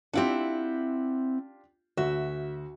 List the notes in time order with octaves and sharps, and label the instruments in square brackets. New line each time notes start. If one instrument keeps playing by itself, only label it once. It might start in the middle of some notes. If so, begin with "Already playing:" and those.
[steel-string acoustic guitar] C4 E4 F#5 [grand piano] D4 F4 G4
[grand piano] D2 F#4 [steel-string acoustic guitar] E5